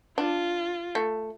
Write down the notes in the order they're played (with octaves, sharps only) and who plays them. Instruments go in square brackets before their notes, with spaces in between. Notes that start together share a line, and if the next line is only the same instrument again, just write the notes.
[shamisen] D4 [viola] F4
[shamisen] A3